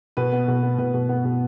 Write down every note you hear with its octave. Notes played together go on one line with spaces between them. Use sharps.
B2 B4
B3
B2
B3
B2 B4
B2
B3
B2